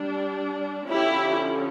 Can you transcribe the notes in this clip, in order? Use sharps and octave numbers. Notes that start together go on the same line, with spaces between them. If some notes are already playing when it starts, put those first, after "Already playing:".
Already playing: G3 D4
D3 F3 C#4 E4 G4